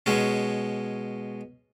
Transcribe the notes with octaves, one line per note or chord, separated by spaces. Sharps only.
B2 G#3 C#4